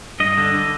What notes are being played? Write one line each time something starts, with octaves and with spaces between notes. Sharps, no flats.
G2 D#5
D3
D3